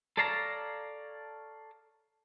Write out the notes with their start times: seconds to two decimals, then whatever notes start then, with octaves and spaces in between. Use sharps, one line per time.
0.17 A4 C#5 D5 F5 A5 A#5